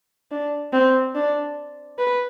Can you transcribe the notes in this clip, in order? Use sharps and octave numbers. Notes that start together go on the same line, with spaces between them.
D4
C4
D4
B4